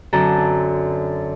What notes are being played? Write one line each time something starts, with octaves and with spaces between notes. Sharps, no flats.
F#2 D3 C4 A4 A#5